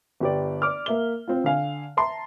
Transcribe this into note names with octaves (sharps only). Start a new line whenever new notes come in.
G1 G4 D5
D5 D6 F6
A#3 E5 G7
C4 F4
D3 F5 G#5
E5 A5 A#5 C6